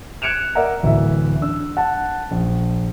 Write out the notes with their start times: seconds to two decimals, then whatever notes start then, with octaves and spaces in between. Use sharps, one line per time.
0.22 F#6 G#6 C#7 D7 E7 F7
0.55 A#4 D5 E5 F#5 A#5
0.83 D1 D2 E3 E5
1.42 D4 E6
1.77 F#5 A5
2.31 A#1